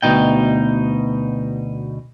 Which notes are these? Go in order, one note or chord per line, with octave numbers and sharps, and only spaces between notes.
D2 B2 D#4 G5